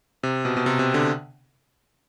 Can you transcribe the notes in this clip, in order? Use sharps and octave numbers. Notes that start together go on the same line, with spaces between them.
C3
B2
B2
C3
C3
D3